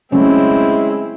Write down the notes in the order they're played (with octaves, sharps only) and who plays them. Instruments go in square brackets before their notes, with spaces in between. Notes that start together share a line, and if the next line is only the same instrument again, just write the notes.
[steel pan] C#3 F#3 A3 [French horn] G#3 [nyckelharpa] C4 E4 [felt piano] C#4